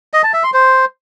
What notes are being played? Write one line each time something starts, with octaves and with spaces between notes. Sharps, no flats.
D#5
A5
E5
C6
C5